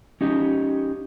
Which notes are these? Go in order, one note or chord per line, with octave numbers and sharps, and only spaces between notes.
C#4 D#4 G4